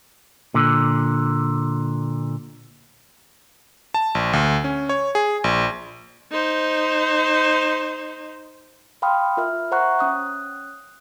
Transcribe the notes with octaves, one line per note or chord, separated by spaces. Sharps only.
A#2 D3
A5
A#1
D2
C#4
C#5
G#4
A#1
D#4 C5
F5 G5 B5 C6 D#6 F6
F4 A#4 E5 F6
C5 E5 F#5 A#5 C#6 F#6
C#4 D#6 F#6